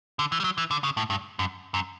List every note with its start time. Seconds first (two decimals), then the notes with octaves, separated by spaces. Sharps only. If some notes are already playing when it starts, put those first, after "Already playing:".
0.19 D3
0.32 E3
0.40 G3
0.44 F#3
0.58 E3
0.71 D3
0.84 C#3
0.97 A2
1.10 G2
1.39 F#2
1.74 F#2